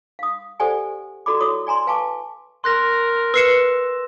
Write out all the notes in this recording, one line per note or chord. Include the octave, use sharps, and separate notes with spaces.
F5 D#6
G4 A4 C5 D5 F#5 G#5
F#4 A4 D5 B5 D6
E4 F#4 A4 C#5 D6 D#6
D5 G#5 A#5 C6
B4 F5 G#5 A5 C#6 D6
A#4 C6 F#6 A#6
B4 E6 C7 C#7 E7